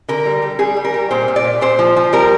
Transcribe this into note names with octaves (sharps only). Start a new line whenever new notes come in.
D3 A#4
G3
G3
G3 G#4
G3
A#4
G3
A#2 C5
A#2
D5
A#2
A#2 C5
F3
F3
G3 A#4